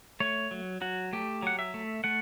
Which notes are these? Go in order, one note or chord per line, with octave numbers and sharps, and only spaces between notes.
A3 C#5
F#3
F#3 F#4
A3 G4
F#3 F#5
E5
A3
A3 F#5